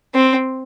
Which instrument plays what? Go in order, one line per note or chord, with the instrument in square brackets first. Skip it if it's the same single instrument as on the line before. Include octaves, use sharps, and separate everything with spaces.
[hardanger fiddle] C4